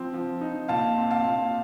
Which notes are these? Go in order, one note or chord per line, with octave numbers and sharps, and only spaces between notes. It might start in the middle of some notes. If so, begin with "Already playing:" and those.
Already playing: F3 C4
F3
D#4
A#2 F5 A5
C4
F5 A5
A#2